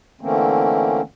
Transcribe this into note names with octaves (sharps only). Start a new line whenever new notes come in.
D3 E3 A3 A#3 C4 C#4